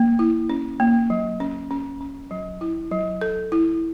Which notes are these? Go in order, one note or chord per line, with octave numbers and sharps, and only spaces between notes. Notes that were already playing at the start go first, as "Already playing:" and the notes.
Already playing: A#3
E4
C#4
A#3
F#3
C#4
C#4
C#4
F#3
E4
F#3
A4
E4